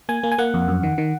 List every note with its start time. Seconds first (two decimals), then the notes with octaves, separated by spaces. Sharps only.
0.09 A#3 G#5
0.23 A#3
0.32 G#5
0.38 A#3 F#5
0.54 F2
0.68 F#2
0.83 D#3
0.98 D#3